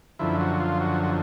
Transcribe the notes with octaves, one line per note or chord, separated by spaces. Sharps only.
F#2 D3 F3 E4
F#4
F4
F#4
F#4